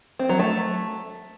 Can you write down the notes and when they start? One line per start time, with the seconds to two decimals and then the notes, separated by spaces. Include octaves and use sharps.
0.19 C4
0.29 F#3
0.39 A3